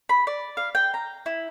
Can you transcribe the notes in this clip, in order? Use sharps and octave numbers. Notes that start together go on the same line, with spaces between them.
B5
D5
F5
G5
A#5
E4